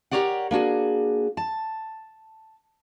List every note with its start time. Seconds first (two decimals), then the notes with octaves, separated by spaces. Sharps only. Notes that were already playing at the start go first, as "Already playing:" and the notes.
0.11 G4 G#4 A#4 C#5 D5 F#5
0.51 A#3 D4 F#4 G#4
1.37 A5